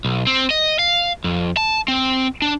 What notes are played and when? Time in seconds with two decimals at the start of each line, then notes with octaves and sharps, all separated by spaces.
0.05 B1
0.27 C4
0.51 D#5
0.79 F5
1.24 F2
1.57 A5
1.88 C4
2.42 D4